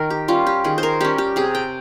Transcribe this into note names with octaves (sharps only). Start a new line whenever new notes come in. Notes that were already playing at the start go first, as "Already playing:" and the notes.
Already playing: D#3 A#4
G4
G3 C#4 F4
G4
D#3 G#4
C5
A#4
G3 C#4 G4
G4
C3 G#4
G5